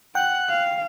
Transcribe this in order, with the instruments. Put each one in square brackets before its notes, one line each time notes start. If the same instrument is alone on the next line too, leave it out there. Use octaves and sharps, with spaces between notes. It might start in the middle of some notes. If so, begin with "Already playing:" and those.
[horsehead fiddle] F#5 [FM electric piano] G5 [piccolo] F#6
[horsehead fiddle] F5